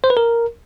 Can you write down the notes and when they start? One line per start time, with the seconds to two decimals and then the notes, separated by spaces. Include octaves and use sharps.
0.04 C5
0.10 B4
0.17 A#4